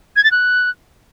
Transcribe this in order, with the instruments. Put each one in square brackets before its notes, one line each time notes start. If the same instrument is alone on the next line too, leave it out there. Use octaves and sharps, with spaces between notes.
[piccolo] G#6
A6
F#6